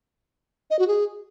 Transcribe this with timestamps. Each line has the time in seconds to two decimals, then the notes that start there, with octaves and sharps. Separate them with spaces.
0.71 D#5
0.79 F#4
0.88 G#4